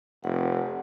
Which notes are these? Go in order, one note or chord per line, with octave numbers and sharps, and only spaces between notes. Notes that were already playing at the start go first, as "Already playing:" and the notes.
F1 F#5